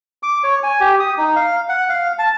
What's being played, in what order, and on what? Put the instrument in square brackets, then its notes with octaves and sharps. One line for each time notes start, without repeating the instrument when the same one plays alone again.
[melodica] D6
C#5
G#5
G4
D#6
D#4
F5
F#5
F5
A5